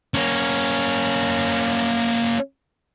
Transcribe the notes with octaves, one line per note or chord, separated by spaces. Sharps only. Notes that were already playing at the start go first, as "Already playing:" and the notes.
A#3 C#4